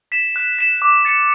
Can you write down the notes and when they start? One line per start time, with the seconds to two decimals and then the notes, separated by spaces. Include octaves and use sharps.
0.12 B6 E7
0.36 F#6
0.59 B6 E7
0.82 D6
1.05 A6 C#7 E7